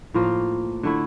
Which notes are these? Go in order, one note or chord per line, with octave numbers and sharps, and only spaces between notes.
A2 F3 A#3 F4
D3 A3 E4